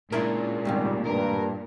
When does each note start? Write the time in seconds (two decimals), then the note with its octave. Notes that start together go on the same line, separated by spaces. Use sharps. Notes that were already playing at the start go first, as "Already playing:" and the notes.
0.12 A#2 C#3 G#3 D4 E4 A#4
0.65 D#2 G#2 C3 D#3 G3
1.06 G2 A#4